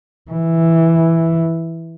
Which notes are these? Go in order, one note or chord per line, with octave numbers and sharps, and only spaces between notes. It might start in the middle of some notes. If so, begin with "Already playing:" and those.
E3